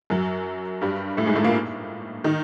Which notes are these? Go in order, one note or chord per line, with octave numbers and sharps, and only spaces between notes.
F#2 F#3
G2 G3
A2 A3
G#2 G#3
A2 A3
A#2 A#3
D#3 D#4